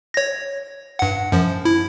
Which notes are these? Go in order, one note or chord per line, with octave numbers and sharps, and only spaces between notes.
C#5 A#6
G2 F#5
F#2 F3
E4